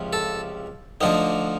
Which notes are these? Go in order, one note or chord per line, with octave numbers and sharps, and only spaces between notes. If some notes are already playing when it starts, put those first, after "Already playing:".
Already playing: C#2 C3 F3
A4
D2 D3 F3 D#4